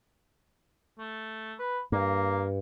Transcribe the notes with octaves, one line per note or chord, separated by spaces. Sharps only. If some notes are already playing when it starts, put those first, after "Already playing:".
A3
B4
G2 A#3